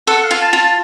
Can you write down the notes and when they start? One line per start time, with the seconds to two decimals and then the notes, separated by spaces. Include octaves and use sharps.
0.07 A4 F#5
0.24 F5
0.31 F4
0.41 A5
0.53 F4
0.59 A5